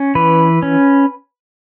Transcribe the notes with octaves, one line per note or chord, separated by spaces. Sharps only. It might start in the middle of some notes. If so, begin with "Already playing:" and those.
Already playing: C#4
E3 B4
C#4